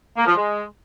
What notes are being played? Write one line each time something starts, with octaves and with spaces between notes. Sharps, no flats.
A#3
F3
G#3